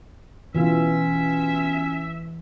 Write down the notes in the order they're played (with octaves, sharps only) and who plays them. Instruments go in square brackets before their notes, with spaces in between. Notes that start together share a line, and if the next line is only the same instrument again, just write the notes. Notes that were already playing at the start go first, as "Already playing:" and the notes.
[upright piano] B2 F4 [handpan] E3 [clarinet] C#4 [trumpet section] E5